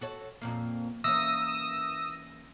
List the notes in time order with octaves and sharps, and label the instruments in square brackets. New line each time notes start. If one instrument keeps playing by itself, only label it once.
[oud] F#4 A4 C#5
F2 A#2 A#3
[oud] E3 A#3 C#4 [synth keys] D#6 E6 A#6